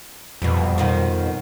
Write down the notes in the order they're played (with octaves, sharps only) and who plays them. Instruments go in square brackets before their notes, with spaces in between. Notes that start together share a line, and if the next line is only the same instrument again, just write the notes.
[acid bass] F2 [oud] B2 G3
[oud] B2 D#3 F3